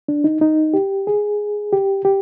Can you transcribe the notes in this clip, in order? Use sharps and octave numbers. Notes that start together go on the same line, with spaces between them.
D4
D#4
D#4
G4
G#4
G4
G4